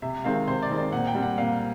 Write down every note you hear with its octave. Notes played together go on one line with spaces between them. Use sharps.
C3 E5
D#3 G#3 C4 F5
C3 C5
D5
D#3 G#3 C4
D5
A#2 F#5
G5
G3 C4
F#5
A#2 F5